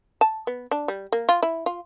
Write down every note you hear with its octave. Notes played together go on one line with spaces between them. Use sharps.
A5
B3
D4
G3
A#3
F4
E4
F4